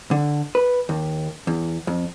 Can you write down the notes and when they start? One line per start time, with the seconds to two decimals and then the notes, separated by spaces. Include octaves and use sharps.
0.11 D3
0.55 B4
0.89 D#2
1.47 E2
1.87 F2